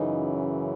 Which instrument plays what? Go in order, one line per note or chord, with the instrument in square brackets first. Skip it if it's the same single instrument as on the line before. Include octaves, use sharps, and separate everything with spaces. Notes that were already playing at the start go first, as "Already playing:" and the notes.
Already playing: [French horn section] F#2 C#3 E3 D#4